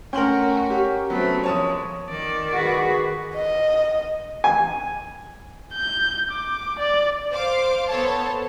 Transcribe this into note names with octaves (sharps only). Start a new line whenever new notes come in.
A3 C#4 F#4 A#4 G5 C6 F#7
G4
C3 F#3 A3 B3 C4
F3 G#3 C#5 A5 D#6
D#3 D5
F#4 G#4 B4
D#5
G#5
G6
D6
D5
C5 F5 D6
B3 A4 C5 C#5 A5